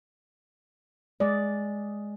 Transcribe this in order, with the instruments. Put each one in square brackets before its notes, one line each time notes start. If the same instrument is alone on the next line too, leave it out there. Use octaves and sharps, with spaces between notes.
[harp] G#3 [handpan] D5